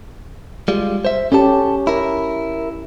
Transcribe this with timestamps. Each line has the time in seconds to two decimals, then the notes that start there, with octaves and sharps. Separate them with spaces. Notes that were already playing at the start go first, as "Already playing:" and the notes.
0.68 G3 G#3 F4
1.05 C5 E5
1.32 C#4 G4 A4 A5
1.87 E4 A#4